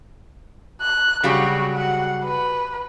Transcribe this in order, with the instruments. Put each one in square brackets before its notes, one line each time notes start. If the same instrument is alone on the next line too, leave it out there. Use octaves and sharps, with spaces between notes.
[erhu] F#6
[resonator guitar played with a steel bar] C#3 F#3 G3 [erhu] F#4
[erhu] F#5
B4